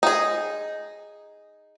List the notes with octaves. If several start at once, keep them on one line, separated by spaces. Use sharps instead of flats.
D#4 G#4